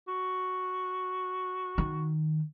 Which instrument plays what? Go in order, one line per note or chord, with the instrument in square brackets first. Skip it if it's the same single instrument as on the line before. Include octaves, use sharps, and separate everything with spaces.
[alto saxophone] F#4
[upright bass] D#3